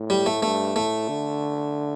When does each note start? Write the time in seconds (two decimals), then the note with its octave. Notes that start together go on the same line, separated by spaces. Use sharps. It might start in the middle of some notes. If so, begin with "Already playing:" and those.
Already playing: A2
0.10 G3
0.26 A3
0.43 G2 A3
0.76 A2 A3
1.09 D3